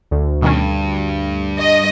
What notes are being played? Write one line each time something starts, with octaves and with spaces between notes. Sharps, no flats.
D2
G2 B2 D#3 C#4
D#5